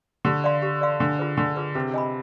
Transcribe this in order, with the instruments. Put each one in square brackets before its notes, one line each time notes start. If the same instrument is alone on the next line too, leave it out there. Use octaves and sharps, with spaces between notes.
[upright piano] D3 [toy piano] G4
[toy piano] D5 F5 C6
G4
D5 F5 C6
[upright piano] D3 [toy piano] D4
[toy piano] F4 G#4 B4
[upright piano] D3 [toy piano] D4
[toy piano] F4 G#4 B4
[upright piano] C3 [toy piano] B4
[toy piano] D#5 G#5 B5